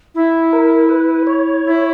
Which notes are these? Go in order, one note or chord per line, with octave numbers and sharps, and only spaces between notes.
E4
A#4
B4
C#5
E4